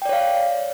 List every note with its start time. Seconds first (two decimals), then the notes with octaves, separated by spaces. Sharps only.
0.02 G5
0.05 D5
0.09 C#5
0.13 F5